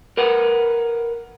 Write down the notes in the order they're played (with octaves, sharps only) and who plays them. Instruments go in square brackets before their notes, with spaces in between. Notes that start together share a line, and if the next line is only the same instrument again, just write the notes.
[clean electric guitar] A#4 B4 F#5